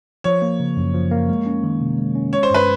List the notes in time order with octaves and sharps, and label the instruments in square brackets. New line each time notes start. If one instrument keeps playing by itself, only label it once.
[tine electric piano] F3 [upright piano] C#5
[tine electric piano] A#3
C#3
F#2
F3
A#3
G#3
C#4
D#3
C3
G#3
C#4
[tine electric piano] G#3 [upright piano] C#5
[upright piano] C5
[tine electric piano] G2 [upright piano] B4